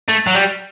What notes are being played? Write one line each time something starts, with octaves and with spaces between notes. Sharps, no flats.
A3
F#3
G3